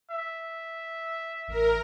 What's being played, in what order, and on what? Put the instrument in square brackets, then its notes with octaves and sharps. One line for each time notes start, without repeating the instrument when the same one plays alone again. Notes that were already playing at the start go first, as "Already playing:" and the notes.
[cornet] E5
[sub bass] A1 [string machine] A#4